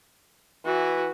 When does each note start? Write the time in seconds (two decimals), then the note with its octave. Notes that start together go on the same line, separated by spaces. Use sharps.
0.65 E3 F#4